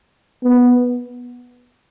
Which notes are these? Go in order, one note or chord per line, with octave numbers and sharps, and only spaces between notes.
B3